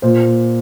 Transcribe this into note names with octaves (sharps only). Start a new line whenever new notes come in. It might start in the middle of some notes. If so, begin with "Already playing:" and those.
A#2 C5